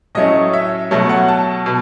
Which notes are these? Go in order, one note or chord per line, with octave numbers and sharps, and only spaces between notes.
A2 F#3 A3 C#4 D#5
E5
B2 F#3 A3
F#5
A5
B2